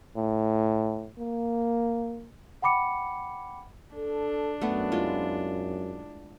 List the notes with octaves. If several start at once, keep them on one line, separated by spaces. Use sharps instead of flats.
A2
A#3
F#5 G5 B5 D6 C#7
D4 A4
F#2 A3 B3
G#3 E4 F4